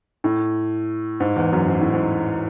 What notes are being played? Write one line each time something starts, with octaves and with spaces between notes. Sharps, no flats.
A2
G#2
E2
F#2
G#2
A2
G#2